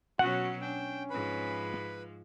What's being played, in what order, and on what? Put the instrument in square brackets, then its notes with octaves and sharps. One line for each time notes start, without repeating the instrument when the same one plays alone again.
[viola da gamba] B2 F#3 C#4 [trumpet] F#4 [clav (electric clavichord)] F#5
[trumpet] C#4 [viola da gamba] D4 [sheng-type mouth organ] G5
[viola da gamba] G#2 F3 [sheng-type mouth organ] B4 B5